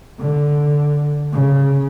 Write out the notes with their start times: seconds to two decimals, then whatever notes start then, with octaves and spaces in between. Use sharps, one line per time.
0.20 D3
1.33 C#3